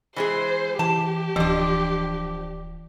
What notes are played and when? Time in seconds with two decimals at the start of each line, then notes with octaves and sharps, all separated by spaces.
0.16 E3 G#3 G#4 C5
0.79 E3 G4 A5
1.36 D1 E3 F3 D4